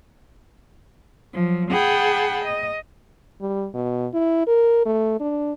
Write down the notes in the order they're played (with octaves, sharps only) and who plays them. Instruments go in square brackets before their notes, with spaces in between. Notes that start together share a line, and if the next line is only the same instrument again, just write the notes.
[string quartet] F3 F#3
G#4 F#5 G5 A5 B5
D#5
[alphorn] G3
B2
E4
A#4
A3
D4